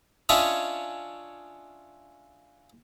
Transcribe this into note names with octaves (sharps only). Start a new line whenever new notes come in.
C#4 D4 F4 C#5 D#5 E5